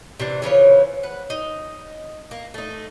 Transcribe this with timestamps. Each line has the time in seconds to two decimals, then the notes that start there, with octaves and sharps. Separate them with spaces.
0.20 C3 E3 D4
0.42 C#3 E3 F3 C#5
1.03 B4 F#5
1.30 D#4
2.31 A#3
2.54 A3 D#4